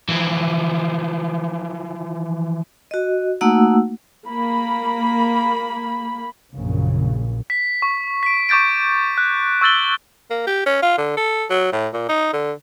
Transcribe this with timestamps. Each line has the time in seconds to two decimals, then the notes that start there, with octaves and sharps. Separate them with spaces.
0.08 E3 F3
2.91 F#4 D#5
3.41 A3 A#3 D#4 F#4 F#5 E6
4.27 A#3 B5
6.53 A#1 F#2 A#2 C#3
7.50 B6
7.82 C#6
8.23 B6 D7
8.49 C#6 D6 G6 A6 D7
9.18 F#6
9.61 C#6 E6 G6 A6 F#7 G7
10.30 A#3
10.47 G4
10.66 C#4
10.82 F4
10.98 D3
11.17 A4
11.50 F#3
11.72 A2
11.94 A#2
12.09 D#4
12.33 D3